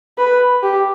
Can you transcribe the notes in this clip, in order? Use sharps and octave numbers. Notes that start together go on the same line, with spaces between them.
B4
G4